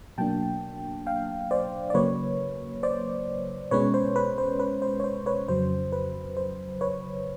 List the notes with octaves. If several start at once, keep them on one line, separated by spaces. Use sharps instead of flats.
B2 F#3 A#3 D4 G5 A5
F5 G5
C5 D5
D5
C#3 F#3 A#3 B4 C#5
C5 D5
B2 G#3 C#4 B4 C#5
C5
B4
C5
B4
C5
C#5
C5
B4 C#5
F2 C#3 F#3 C5
B4
C5
B4 C#5